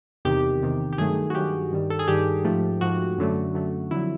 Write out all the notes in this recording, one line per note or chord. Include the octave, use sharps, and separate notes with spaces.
E2 C3 D#3 G4
E2 C3 D#3
G4
G2 D#3 F#3 A3 G#4
F#4
G2 D#3 F#3 A3 G4
G2 D#3 G3
A4
G#4
G2 D#3 G3 G4
G#2 F3 A3
G#2 F3 A3 F#4
F#2 D3 F#3 A3
F#2 D3 F#3 A3
F2 D3 F#3 E4